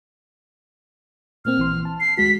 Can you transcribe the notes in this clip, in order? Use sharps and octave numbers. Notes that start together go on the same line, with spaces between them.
A#2 A#3 C4 F6
A#1 E3 C6
A5
C7
D#2 G#3 F#4 B6